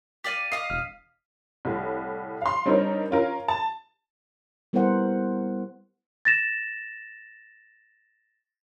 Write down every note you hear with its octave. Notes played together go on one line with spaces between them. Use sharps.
G4 D5 F5 B6 D#7
D#5 F5 D#6 C7
E1 F6
C2 A2
F5 C6
G3 C4 D4 D#4 A#4 C#5
C#4 F4 A#4
A5
G3 B3 E4 A#4 C5 F#5
A6 A#6 E7